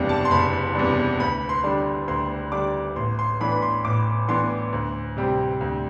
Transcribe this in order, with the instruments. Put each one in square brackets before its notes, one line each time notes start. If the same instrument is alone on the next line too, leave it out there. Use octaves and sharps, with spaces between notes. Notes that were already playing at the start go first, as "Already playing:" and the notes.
Already playing: [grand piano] F#1 E2 C3 G3 D4
A5
C6
F#1 B5
E2 C3 G3 D4
D2 B5
C6
D3 G3 D4
D2 C6
D3 G3 D4 D6
A1 C6
C6
A2 E3 B3 D4 B5
B5
C6
A1 D6
A2 E3 B3 D4 C6
D2
C3 G3 C4
D2